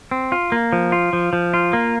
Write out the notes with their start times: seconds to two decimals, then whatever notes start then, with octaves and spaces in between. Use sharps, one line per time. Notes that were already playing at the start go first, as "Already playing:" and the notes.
0.11 C4
0.32 F4
0.52 A#3
0.73 F3
0.92 F4
1.13 F3
1.33 F3
1.54 F4
1.73 A#3